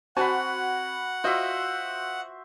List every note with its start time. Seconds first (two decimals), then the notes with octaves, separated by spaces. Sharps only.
0.17 C4 F#4 F#5 G#5 A5 B5
1.24 F4 F#4 C5 D#5 E5